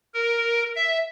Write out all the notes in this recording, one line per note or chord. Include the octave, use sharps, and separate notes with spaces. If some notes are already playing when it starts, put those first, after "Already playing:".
A#4
E5